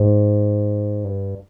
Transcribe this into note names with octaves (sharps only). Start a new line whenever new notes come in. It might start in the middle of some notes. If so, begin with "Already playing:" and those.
Already playing: G#2
G2